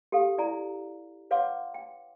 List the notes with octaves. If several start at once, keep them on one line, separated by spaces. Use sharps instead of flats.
G4 A4 F5
E4 D5 G#5 A#5
B4 C#5 F5 F#5 C6 D6
G5